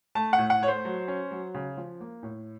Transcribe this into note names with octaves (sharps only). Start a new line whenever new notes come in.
A3 A5
F#5
A2
F#5
A3 C#5
C5
F#3
C#4
F#3
C#3
F3
A#3
A2